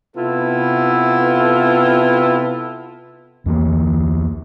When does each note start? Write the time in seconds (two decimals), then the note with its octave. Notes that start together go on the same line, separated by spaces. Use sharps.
0.15 C3 B3 E4 F4 A4
3.46 E2 E3 F#3 A#3